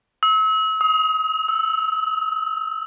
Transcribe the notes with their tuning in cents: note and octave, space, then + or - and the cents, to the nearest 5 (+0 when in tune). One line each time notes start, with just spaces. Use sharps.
E6 -35
D#6 +35
E6 +0